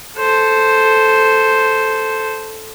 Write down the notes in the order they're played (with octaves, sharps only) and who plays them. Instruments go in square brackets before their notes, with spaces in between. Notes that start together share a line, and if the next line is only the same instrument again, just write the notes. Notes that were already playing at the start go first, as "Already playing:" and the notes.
[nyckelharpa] A4 C5